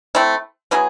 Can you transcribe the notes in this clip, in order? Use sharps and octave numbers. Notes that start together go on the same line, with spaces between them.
A3 C4 E4
F#3 B3 E4 G#4